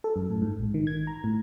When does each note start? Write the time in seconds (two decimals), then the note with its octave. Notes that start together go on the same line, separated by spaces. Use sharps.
0.04 A4
0.16 F#2
0.30 A2
0.42 G#2
0.59 A#1
0.74 D#3
0.87 G#6
1.07 A#5
1.24 A2